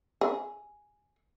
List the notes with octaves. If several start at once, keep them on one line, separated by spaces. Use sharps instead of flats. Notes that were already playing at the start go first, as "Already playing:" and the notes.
G#4